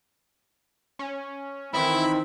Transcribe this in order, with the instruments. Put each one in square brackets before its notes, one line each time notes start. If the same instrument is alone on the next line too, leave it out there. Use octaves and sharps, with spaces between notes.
[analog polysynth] C#4
[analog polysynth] D#3 E3 [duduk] C4 [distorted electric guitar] E4 [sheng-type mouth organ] B5